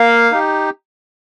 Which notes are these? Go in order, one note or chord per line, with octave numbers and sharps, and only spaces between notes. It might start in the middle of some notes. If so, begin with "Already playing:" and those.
Already playing: A#3 F5
D#4 G4